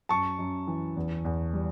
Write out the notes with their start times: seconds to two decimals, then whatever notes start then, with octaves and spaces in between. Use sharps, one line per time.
0.09 F#2 A5 C#6
0.39 F#2
0.67 E3
0.96 E2
1.25 E2
1.53 G3